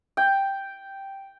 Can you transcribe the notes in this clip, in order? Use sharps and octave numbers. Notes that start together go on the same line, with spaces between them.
G5